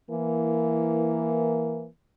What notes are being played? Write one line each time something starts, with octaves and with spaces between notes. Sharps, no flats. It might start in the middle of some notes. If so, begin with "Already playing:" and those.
E3 A#3